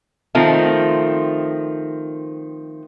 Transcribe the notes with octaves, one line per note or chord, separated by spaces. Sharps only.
D#3 F3 A3 C4